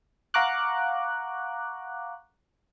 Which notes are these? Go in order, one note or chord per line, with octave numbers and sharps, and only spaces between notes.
F5 F#5 A#5 C#6 D6 F#6